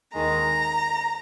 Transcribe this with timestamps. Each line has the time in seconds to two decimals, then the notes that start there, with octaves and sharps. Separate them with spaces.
0.14 D#2 D#3 G#3 A#5